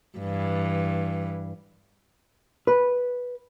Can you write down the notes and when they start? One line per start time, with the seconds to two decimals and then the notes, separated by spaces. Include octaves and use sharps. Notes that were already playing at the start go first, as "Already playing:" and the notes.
0.19 G2 E3
2.67 B4